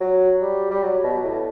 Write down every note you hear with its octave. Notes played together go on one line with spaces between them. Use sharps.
F#3
G3
G3
F#3
B2
A2